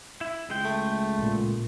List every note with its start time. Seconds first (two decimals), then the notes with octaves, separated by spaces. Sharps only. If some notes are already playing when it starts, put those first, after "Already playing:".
0.21 E4
0.49 C#2 G#3 G5
0.65 A3
1.19 A1 A#2